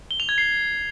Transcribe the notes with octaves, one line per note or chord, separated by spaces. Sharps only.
G7
F7
G#6
C7